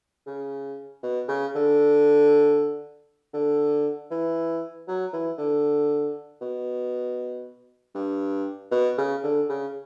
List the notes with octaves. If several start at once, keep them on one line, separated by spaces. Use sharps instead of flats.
C#3
B2
C#3
D3
D3
E3
F#3
E3
D3
B2
G2
B2
C#3
D3
C#3